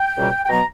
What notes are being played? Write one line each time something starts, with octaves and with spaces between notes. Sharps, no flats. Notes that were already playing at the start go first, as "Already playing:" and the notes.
Already playing: G5
C#2 B2 G3 A#3
G5
B2 F#3 B3 A#5